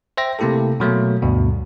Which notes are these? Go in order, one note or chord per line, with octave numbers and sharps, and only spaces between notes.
C5 E5 G5 A#6
C3 A3 A#3 E4 G4 A4
B2 F#3 A3 A#3
D2 G2 B2